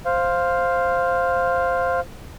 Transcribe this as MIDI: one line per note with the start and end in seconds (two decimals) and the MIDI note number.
0.06 2.00 72
0.06 2.00 77